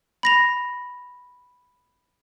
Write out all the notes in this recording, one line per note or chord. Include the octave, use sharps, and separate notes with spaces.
B5 A#6 F7